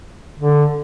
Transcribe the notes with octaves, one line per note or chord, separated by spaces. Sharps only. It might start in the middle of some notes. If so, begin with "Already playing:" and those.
D3